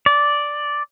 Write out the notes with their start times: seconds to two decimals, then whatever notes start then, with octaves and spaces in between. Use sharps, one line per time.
0.06 D5